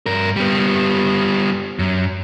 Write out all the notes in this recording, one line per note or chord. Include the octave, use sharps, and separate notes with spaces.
G2 A#4
G3 B3
F#2